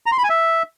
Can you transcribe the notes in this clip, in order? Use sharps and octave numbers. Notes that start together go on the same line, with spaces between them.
A#5
C6
B5
G#5
E5